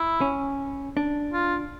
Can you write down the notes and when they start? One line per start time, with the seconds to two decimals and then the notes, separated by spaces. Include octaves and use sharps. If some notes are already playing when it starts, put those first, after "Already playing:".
Already playing: E4
0.21 C#4
0.97 D4
1.33 F4